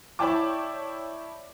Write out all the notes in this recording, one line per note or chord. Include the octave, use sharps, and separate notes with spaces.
E4 C#5 D5 G5 A5 D6